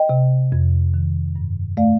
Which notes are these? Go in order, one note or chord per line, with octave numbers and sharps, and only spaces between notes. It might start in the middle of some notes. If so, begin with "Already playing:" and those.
Already playing: D#5 G5
C3
F2
D#3
G2
A3 D5 F5